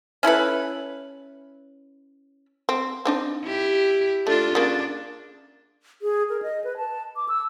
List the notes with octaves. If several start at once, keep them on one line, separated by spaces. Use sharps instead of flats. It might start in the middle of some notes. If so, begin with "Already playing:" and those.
C#4 E4 A4 B4
C4
C4 D4 D#4
E4 G4
A3 D4 F4
C#3 A#3 D4
G#4
A#4
D#5
B4
A5
D6
E6